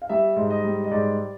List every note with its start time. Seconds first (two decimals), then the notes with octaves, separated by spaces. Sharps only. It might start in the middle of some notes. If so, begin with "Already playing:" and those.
0.02 F5
0.09 G3 E5
0.36 G#2
0.50 D#5
0.65 G3
0.84 D#5
0.91 G#2 D5